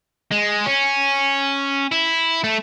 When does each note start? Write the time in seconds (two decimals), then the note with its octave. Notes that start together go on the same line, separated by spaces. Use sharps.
0.32 G#3
0.66 C#4
1.92 E4
2.44 A3